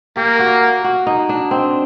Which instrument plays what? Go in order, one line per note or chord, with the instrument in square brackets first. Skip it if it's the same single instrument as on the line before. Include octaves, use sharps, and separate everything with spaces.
[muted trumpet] A#3 [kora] G4
[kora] F#4
F#4
D#4
D4
C4